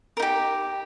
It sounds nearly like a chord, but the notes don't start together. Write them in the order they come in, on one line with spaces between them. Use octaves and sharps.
A#4 D#4 G4